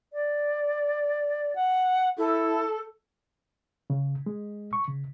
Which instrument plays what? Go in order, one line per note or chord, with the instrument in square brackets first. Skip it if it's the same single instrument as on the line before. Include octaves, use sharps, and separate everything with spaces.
[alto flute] D5
F#5
[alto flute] E4 [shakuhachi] A4
[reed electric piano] C#3
G#3
C#6
C#3